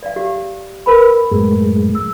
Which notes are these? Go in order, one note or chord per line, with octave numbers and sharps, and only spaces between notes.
D5 F5
G4
A#4 B4 B5
F#2 A2 G#3
E6